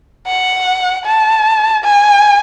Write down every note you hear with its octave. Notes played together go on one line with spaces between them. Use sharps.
F#5
A5
G#5